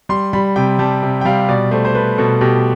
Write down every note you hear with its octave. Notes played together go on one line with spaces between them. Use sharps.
G3 C6
G3 B5
C3 G5
G3 A5
C3
G5
G3 F5
B2 D5
A3 C5
C5
A3 B4
B2 A4
B2 G4